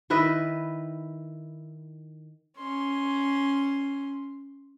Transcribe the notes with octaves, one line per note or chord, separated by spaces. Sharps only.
D#3 E4 B4 D#5
C#4 C6